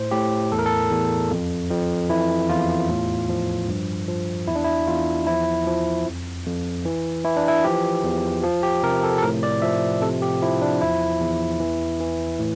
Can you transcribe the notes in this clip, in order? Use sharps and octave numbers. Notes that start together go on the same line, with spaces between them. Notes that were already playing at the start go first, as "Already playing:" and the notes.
Already playing: A2 C5
A2 G4
E2 A4
A#4
A4
E2
F2
F2
E3 E4
E2 F4
A2
F3
G2
F3
E2 E4
D4
E4
E2 F4
F3 E4
F3
F2
F2
E3
E3 E4
D4
E4
F3 G4
E2
F3
G4
C3 A#4
A4
A4
A2 A#4
D5
F3 E5
C3 A4
G4
F3 E4
D4
E2 E4
E2
E3
E3
A2